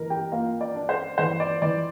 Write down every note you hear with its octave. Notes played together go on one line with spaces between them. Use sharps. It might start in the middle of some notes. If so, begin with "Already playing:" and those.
Already playing: E3 A#4 A#5
G4 G5
A#3 F4 F5
D5
D4
C5
E3 C5
D5
E3 D5